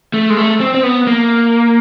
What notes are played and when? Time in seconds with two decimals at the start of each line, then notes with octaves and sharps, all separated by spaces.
0.14 A3
0.30 G#3
0.37 A3
0.60 C4
0.74 C4
0.83 B3
1.07 A#3